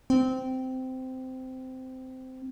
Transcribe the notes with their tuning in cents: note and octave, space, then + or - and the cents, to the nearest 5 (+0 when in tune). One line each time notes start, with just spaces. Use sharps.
C4 -15